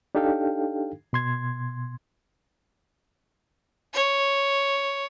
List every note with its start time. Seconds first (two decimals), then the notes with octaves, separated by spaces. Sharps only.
0.15 D4 D#4 G4 A4 F5 G5
1.13 B2 C6 G#6
3.94 C#5